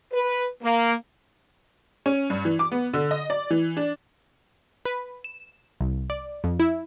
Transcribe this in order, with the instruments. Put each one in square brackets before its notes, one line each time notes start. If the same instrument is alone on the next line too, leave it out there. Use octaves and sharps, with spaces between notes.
[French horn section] B4
A#3
[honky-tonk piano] C#4
G2
E3
D6
B3
D3
D#5
D5
E3
D4
[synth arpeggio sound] B4
E7
C2
D5
F2
E4